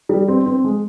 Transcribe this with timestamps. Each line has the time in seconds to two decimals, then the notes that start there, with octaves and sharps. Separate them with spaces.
0.09 G3
0.28 C4
0.46 C4
0.64 G#3